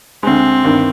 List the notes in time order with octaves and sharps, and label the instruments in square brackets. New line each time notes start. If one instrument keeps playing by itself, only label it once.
[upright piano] D2 D3 G#3 [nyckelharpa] C4
[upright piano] G1 G2 D#3